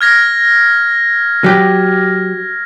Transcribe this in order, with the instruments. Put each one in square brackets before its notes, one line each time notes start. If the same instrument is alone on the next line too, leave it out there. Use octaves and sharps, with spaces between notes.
[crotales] F6 G#6 A#6
[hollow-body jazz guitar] F#3 G4